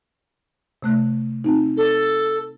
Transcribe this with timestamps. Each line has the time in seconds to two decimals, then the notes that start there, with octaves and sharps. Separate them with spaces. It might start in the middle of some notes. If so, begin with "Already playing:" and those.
0.82 C3 A3 F#6
1.44 C4 D#4
1.77 A4